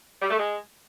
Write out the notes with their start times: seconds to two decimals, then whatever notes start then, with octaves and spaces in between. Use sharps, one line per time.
0.22 G3
0.31 A3
0.39 G#3